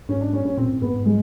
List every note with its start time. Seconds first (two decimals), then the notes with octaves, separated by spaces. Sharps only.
0.09 G#2 C#4
0.21 D4
0.33 C#4
0.45 C#4
0.57 A#2 C4
0.69 A2
0.82 G#2 B3
0.94 G#2
1.06 G#3